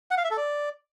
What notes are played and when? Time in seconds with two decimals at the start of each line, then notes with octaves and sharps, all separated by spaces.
0.11 F#5
0.18 F5
0.24 E5
0.31 A4
0.37 D5